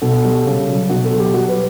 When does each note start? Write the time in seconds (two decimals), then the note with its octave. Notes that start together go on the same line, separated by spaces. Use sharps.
0.01 B2 A4
0.24 G3
0.46 C#3
0.68 F#3
0.89 B2 F#4
1.05 A4
1.11 F#3
1.19 G4
1.33 G3 F#4
1.49 B4